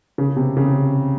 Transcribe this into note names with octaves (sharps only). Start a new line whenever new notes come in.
C#3
C3
C#3